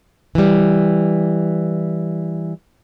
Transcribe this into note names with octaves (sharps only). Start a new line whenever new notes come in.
E3 G3